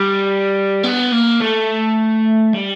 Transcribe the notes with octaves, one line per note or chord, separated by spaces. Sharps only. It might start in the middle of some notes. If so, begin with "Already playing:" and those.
Already playing: G3
B3
A#3
A3
G3